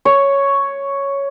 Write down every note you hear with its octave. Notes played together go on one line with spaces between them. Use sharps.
C#5